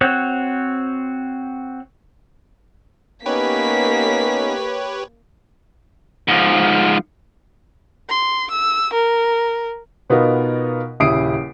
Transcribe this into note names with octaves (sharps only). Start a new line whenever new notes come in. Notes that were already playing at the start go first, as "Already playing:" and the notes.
C4 F#4 C5 C#5 F#6
A#3 B3 C#4 D#4 G4 B4 C#5 B6
G#2 F3
C6
E6
A#4
B2 B3 D#4 F4 A#4
D#1 C#3 E4 D#6 C7 D7